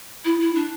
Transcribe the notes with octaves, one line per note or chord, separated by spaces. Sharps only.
E4
E4
D4